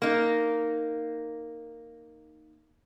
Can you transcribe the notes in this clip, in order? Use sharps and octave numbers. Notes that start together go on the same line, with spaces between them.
A#3 D#4